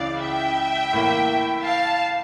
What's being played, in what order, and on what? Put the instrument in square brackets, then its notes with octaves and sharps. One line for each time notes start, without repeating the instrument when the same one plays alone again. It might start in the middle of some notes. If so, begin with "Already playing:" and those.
Already playing: [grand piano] C#2 C#3 E3 [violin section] D5 F5
[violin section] E5 G5
[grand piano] A2 E3 A#3
[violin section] F5 A5